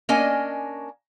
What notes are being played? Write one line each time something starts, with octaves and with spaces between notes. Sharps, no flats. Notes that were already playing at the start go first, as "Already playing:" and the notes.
A#3 C#4 D4 A#4 D#5 G#5